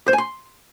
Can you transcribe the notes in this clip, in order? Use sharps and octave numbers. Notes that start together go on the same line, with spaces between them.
C5
G#5
C6